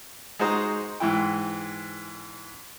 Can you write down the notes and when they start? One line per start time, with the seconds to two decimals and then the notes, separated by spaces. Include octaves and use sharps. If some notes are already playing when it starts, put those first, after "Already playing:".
0.39 G#3 D#4 F#4 C5 A#5 D#6
1.00 G#2 E3 E4 G5